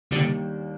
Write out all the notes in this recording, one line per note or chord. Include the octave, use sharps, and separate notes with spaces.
D#2 D3 D#3 G3 A#3 D4